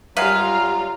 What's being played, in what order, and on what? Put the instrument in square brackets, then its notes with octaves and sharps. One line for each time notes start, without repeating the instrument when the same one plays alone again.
[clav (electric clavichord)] F#2 G#3 B4 [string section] G3 F4 [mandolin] F5 [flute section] A#5